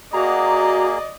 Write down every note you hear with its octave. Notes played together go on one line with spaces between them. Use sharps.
A#3 F#4 G#4 D5 D#5 A#5